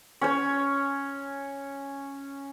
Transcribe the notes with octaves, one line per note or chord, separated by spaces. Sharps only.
C#4 C#5